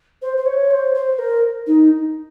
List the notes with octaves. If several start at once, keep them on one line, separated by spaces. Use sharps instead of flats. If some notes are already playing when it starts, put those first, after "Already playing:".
C5
C5
C#5
C5
C5
A#4
D#4